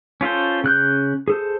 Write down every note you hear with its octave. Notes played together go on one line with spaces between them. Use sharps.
C#4 F4 A4 C5
C#3 F#6 G6
G#4 A4 C5